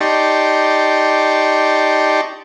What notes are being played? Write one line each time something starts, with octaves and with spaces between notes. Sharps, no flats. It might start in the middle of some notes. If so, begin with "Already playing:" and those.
D#4 G4 D5 A5 C6 C#6